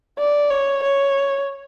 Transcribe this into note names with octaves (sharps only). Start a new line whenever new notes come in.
D5
C#5
C#5